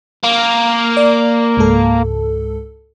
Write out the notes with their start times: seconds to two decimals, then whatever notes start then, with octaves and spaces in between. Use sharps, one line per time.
0.24 A#3
0.97 D5
1.57 C#2 G#2 A4